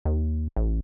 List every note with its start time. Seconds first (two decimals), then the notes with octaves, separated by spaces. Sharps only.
0.05 D#2
0.56 A1